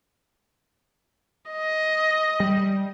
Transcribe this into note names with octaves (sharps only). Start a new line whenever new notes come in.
D#5
G3